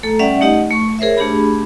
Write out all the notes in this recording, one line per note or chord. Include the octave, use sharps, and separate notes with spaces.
A3 A4 A#5
G3 C#4 D5 E5 F#5
A3 D#4 G4 D#5 F#5
A3 C#6
G#4 A#4 C5 C#5 E5
A3 D4 G4 G#4 B5